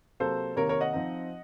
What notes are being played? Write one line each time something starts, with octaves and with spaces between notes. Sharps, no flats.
C3 F#3 A#3 A4 C5
C3 D#3 A#3 A#4 C#5
A#4 C#5
D#5 F#5
F3 C4 D#4